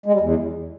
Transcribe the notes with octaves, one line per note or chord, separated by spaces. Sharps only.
G#3
G3
E2